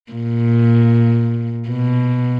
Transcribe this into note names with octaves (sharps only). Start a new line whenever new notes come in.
A#2
B2